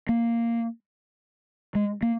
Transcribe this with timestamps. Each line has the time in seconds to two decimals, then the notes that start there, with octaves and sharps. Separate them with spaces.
0.09 A#3
1.75 G#3
2.02 A#3